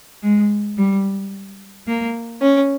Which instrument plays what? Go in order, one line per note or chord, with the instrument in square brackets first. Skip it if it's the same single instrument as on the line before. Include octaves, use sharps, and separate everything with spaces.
[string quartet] G#3
G3
A#3
C#4